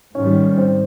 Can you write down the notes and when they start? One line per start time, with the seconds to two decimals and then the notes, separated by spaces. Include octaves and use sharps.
0.15 G#2 D#3 G3 C#4 C#5
0.58 C4 C5